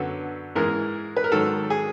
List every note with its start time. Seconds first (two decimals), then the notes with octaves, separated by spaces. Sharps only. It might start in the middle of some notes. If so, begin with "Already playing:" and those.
Already playing: F#2 D3 F#3 B3 A4
0.55 G#2 E3 G#3 A#4
1.16 B4
1.24 A#4
1.32 G#2 D#3 F#3 A4
1.70 G#4